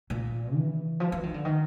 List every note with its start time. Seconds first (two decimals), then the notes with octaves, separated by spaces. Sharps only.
0.10 A#2
0.55 E3
1.00 F3
1.12 E3
1.23 D#3
1.34 D3
1.45 D#3